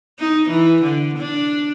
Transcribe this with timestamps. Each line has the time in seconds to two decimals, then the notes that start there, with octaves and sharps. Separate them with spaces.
0.19 D#4
0.50 E3
0.83 D3
1.18 D4